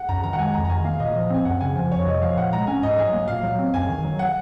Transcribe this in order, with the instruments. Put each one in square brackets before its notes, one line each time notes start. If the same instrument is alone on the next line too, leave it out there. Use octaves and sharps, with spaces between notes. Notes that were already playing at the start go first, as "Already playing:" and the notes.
Already playing: [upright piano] F#5
[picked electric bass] F#2 [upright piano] A#5
[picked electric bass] D#3 [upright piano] A#5
[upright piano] F#5
[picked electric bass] G#3 [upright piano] G#5
[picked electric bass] F2 [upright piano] A#5
[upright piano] A#5
[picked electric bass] D#3 [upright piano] G#5
[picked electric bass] A#3 [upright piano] F5
[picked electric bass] A#2 [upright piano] D#5
[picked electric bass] F3
[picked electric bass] C4 [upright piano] G#5
[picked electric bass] F#2 [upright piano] F#5
[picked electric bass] C#3 [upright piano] G#5
[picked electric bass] F3 [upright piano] G#5
[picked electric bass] F2 [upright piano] C#5
[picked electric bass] C3 [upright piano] D#5
[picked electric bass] F3 [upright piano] F5
[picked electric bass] A#2 [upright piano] F#5
[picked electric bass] G#3 [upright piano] A#5
[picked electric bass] C#4 [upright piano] G#5
[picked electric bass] G#2 [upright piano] D#5
[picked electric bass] F#3 [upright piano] G#5
[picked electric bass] A#3
[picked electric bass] A#2 [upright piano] F5
[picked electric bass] F#3
C4
[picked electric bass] F#2 [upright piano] G#5
[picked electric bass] D#3
F#3
[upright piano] F#5